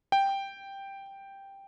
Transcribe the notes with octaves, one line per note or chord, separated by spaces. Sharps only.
G5